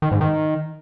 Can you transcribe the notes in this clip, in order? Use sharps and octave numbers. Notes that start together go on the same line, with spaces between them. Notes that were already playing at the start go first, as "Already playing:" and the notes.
D#3
G#2
D#3